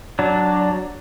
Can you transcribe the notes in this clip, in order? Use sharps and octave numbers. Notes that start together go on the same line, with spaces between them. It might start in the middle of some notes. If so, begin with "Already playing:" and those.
F#3 D4